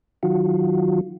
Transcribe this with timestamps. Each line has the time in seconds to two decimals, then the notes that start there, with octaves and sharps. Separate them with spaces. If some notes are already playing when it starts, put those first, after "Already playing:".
0.23 D#3 F#3 F4 F#4